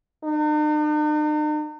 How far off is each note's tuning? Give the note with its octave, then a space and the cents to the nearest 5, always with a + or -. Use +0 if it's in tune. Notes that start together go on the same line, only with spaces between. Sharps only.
D#4 -45